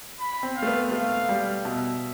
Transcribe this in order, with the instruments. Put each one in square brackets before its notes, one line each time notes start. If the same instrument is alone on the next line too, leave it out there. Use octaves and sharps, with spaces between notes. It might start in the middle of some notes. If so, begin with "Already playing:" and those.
[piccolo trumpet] B5
[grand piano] C4
[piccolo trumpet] F5
[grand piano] A3
B3
[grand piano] A3 [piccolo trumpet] F5
[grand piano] G3
[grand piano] B2 [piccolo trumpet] E5